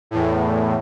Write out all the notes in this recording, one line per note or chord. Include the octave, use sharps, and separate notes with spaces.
E2 A2